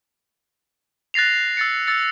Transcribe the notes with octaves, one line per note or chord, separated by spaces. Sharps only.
F#6 A6 A#6 C7 F7
E6 A6 C#7
E6 A6 C#7